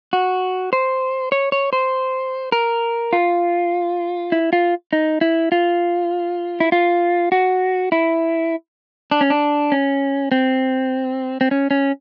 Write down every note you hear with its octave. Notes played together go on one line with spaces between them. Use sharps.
F#4
C5
C#5
C#5
C5
A#4
F4
E4
F4
D#4
E4
F4
E4
F4
F#4
E4
D4
C#4
D4
C#4
C4
C4
C#4
C#4